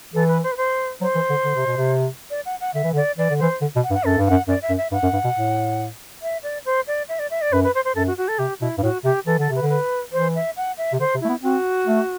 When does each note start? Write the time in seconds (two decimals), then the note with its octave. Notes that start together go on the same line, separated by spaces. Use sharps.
0.14 E3 A4
0.28 B4
0.43 C5
0.52 B4
0.57 C5
1.01 F#3 C5
1.15 E3
1.29 D3
1.44 D3
1.55 C3
1.66 B2
1.77 C3
2.30 D5
2.45 F#5
2.60 F#5
2.74 D3 E5
2.84 E3
2.93 D3
2.96 D5
3.18 E3 D5
3.30 D3
3.39 E3 C5
3.61 D3
3.76 B2
3.84 F#5
3.90 G2
3.94 F#5
4.04 F#2 A4
4.18 G2
4.27 F#2 F#5
4.48 F#2 D5
4.62 E5
4.69 F#2
4.78 E5
4.92 G2 F#5
5.02 F#2
5.13 G2
5.24 B2
5.35 A2
6.22 E5
6.43 D5
6.65 C5
6.87 D5
7.09 E5
7.19 D5
7.30 E5
7.41 D5
7.52 F#2 B4
7.64 B4
7.74 C5
7.85 C5
7.95 F#2 A4
8.07 F#4
8.17 F#4
8.28 A4
8.39 C3 G4
8.60 B2 E4
8.78 G2
8.82 A2 F#4
9.04 C3 G4
9.26 E3 A4
9.38 D3 A4
9.50 C3
9.55 B4
9.61 D3
9.69 B4
10.12 E3 C5
10.35 E5
10.57 F#5
10.78 E5
10.93 C3
11.00 D3 C5
11.14 C3
11.21 A3 E4
11.29 B3
11.43 C4 F#4
11.87 A3